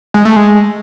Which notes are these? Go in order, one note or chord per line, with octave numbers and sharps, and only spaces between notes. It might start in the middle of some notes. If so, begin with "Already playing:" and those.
G#3
A3
G#3